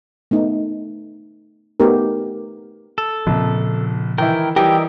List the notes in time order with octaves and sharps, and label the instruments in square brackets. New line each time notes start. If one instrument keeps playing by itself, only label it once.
[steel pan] A3 B3 D#4
A3 B3 D#4 G4 A#4
[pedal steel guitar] A4
[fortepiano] A#1 F2 [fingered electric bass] A#2 C#3 F3
[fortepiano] D#3 E3 E4 [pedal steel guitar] A#4 G5
[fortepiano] E3 G3 [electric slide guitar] G4 [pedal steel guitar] A#4 D#5 E5